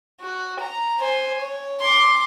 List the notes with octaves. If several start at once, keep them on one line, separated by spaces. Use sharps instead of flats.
F#4
A#5
C5 G#5
C#5
C6 D6